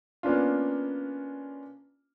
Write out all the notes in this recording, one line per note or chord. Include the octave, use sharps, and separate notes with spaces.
A#3 B3 C#4 D4 F4